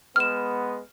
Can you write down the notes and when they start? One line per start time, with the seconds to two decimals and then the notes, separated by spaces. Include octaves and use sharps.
0.16 G#3 B3 F6 E7